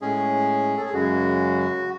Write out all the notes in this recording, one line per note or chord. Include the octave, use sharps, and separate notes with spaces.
A2 G#3 C#4 G#4
A4
G#4
F#2 C#3 G#3 F#4